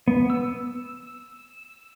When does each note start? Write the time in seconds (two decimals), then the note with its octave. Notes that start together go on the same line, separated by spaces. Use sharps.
0.08 B3
0.30 E6